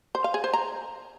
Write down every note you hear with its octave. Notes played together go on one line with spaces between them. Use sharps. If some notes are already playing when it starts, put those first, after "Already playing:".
C5
F5
G#4
C5
A#5